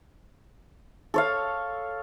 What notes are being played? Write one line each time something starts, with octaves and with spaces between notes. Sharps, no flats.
A4 C#5 F5